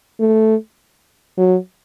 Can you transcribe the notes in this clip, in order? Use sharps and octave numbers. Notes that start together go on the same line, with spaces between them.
A3
F#3